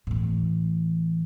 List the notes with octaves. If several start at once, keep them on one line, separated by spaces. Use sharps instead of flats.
A2 E3